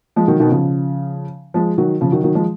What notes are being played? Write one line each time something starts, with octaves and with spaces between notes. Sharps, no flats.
F3 G#3
D#3 F#3
B2 D#3
C#3 F3
F3 G#3
D#3 F#3
C#3 F3
D#3 F#3
D#3 F#3
F3 G#3